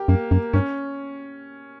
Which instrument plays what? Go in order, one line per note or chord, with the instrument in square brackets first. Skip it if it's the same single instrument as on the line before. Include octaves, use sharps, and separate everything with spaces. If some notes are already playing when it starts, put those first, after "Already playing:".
Already playing: [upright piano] G4 A#4
[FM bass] F#2 [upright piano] A#3
[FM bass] F#2 [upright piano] A#3
[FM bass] G2 [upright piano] C#4